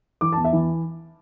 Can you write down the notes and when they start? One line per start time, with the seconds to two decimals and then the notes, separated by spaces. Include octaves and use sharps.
0.21 E3 D6
0.32 E2 A5
0.45 E5
0.53 E3